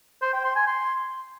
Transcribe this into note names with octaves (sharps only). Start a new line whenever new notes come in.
C5
G5
C6
G#5
C6